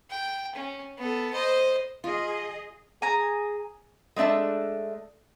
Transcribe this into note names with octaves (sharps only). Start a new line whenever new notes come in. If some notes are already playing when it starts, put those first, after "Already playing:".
G5
C#4
B3 A4
C5 D#5
F4 G#4 D#5
G#4 G#5 A#5
G#3 A3 D4 E5 A5